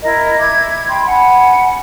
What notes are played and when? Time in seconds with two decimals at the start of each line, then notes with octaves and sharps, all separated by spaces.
0.03 E4 A#4 D#5 A#5
0.38 E4 D6 G#6
0.89 G5 B5 C6
1.06 F#5 G#5 B5